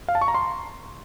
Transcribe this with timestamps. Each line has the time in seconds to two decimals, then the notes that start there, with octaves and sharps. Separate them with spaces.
0.08 F5
0.15 A5
0.21 C#6
0.28 A#5
0.35 C6